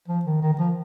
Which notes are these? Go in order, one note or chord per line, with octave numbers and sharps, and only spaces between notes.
F3
D#3
D#3
D#3
F3